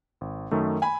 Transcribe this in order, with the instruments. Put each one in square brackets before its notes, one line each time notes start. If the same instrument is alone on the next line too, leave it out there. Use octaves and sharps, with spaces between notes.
[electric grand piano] G#1
F#2 D#3 A3
[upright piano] G#5 B5